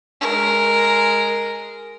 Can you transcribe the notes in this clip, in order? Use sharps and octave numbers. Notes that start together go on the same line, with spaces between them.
G#3 A#4